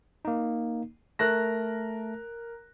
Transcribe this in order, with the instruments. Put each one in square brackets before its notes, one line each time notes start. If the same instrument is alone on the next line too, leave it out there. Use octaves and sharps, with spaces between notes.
[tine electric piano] A#3 D#4
[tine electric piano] A3 A5 [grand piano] A#4 F#6 A#6